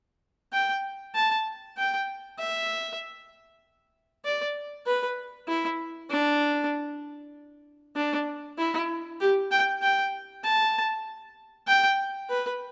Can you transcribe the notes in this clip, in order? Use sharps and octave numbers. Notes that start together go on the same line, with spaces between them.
G5
A5
G5
E5
D5
B4
E4
D4
D4
E4
G4
G5
G5
A5
G5
B4